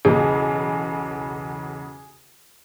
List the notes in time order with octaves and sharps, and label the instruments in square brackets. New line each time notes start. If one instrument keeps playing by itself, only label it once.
[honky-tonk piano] B1 E2 C#3 [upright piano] G#4